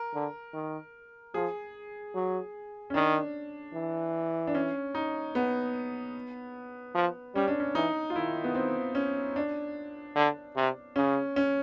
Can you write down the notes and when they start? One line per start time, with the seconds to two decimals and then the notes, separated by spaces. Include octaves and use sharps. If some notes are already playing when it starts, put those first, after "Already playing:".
Already playing: A#4
0.14 D3
0.54 D#3
1.34 F3 G#4
2.15 F#3
2.90 C#4
2.94 D#3 D4
3.74 E3
4.47 D4
4.55 C#4
4.95 D#4
5.35 B3
6.95 F3
7.35 G3 C#4
7.48 D4
7.60 C#4
7.75 E3 D#4
8.10 F4
8.16 D#3 E4
8.44 B3
8.55 C4
8.95 C#4
9.36 D4
10.16 D3
10.56 C3
10.96 C#3 C#4
11.36 C#4